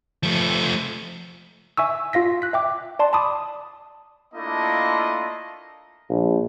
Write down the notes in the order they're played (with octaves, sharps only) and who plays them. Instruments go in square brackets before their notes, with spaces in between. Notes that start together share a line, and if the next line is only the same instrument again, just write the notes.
[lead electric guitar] F3 A3
[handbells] E5 G#5 C#6 E6
F4 F5 A#6 B6
F#6 B6
E5 G5 D6
D5 A5 C6
A5 B5 D6 D#6
[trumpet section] A3 A#3 D4 E4 F4 D#5
[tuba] A#1